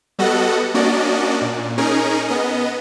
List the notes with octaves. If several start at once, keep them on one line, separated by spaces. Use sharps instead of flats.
G3 B3 F#4 A4 D#5 F#5
A#3 C#4 D4 F#4 D5 D#5
A#2
C#4 D#4 G#4 A#4
B3 D#5